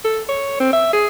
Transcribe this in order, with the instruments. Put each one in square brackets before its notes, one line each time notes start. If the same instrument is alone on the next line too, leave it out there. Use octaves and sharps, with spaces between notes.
[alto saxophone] A4
C#5
C4
E5
G#4